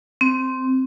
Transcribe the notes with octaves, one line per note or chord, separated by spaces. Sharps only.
C4